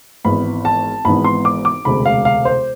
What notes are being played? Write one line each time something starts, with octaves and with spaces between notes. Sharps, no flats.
G#1 G#2 E3 B3 B5
A5
G#1 G#2 E3 B3 B5
C6
D6
D6
E1 D2 C3 G#3 B5
F5
F5
C5